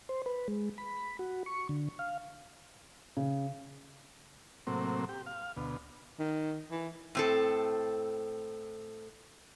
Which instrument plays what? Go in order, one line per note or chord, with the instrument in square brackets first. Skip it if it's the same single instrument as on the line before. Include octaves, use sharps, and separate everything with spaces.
[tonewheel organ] C5
B4
G#3
B5
F#4
C#6
D3
F5
[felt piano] C#3
[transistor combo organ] A2 C3 F#3 A#3 C4
G4
F5
D2 B2
[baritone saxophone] D#3
E3
[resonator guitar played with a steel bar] A2 C4 A4